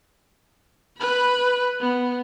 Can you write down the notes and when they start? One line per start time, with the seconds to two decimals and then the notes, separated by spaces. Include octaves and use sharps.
0.98 B4 B5
1.80 B3